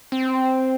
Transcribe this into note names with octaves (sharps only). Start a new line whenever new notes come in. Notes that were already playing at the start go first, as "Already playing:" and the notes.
C4